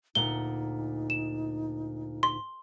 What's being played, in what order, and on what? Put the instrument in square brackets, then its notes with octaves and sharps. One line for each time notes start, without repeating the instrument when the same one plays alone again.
[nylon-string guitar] D2 A#2 F#5 [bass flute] D#4 [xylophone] G7
[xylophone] E7
C6